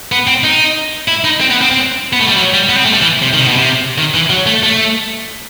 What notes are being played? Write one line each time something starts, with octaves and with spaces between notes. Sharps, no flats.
B3
C4
D#4
E4
D#4
C4
B3
C4
C4
B3
A3
G3
F#3
G3
B3
C4
A3
G3
E3
C3
D#3
C3
B2
C3
D#3
E3
F#3
A3
A3